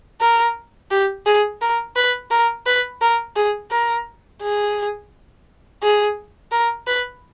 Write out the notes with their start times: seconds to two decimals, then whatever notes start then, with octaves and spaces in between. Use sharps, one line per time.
0.21 A#4
0.91 G4
1.26 G#4
1.62 A#4
1.97 B4
2.31 A#4
2.67 B4
3.01 A#4
3.36 G#4
3.71 A#4
4.42 G#4
5.83 G#4
6.52 A#4
6.87 B4